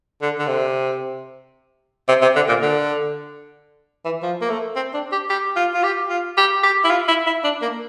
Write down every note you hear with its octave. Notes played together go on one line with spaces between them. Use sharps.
D3
D3
C3
C3
C3
D3
A#2
D3
E3
F3
A#3
A3
C4
D4
G4
G4
F4
F4
G4
F4
G4
G4
E4
F4
E4
E4
D4
A#3